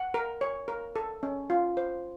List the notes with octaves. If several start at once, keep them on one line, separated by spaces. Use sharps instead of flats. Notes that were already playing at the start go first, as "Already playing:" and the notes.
Already playing: F#5
A#4
C#5
A#4
A4
C#4
F4
C5